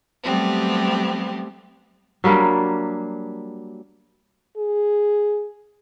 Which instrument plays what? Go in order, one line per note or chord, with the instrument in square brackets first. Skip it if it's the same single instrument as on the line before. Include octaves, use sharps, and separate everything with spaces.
[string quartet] F#3 G3 A3 B3 C4 G4
[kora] F#3 G3 A#3 D4
[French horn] G#4